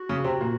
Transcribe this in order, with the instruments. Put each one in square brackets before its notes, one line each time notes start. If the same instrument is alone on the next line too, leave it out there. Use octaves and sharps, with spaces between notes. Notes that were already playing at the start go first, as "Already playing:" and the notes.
Already playing: [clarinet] F#4
[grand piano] C#3 C#4
C3 C4
A#2 A#3